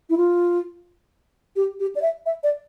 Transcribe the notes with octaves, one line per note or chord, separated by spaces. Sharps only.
E4
F4
G4
G4
D5
E5
E5
D5